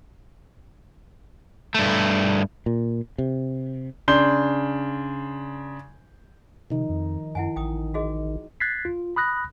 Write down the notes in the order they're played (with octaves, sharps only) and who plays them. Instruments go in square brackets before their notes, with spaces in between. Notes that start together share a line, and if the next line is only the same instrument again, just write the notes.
[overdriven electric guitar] G2 A3
[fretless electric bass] A#2
C3
[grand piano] C#3 D4 C6 G6 G7
[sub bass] C3 [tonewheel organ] D#3 [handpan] F3 D#4
[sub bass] F2
[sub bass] F#2 [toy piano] E4 F#5 G#5
[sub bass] A1 [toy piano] G5 D#6
[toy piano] F#4 G#4 D#5
[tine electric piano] F#6 G#6 A6 B6 C7
F4
B5 D#6 F#6 A#6